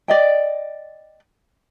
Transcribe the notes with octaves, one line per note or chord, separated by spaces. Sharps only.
D5 D#5 G5